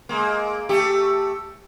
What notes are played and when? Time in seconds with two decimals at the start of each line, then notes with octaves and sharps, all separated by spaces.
0.09 G#3 A#3
0.69 A3 G4